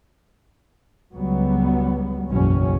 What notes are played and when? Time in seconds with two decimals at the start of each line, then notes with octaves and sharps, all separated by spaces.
1.15 C#2 F#3 G3 B3
2.30 F#1 B1 E2 B2 F#3 C#4